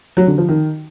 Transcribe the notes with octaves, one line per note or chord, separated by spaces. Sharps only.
F#3
D3
F3
D#3